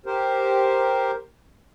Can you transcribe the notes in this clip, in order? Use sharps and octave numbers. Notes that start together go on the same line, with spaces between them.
G4 A#4 C5